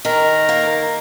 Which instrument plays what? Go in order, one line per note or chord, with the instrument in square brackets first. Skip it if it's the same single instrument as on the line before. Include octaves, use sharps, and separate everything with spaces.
[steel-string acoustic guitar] D#3 [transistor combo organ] A#4
[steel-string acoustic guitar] A#3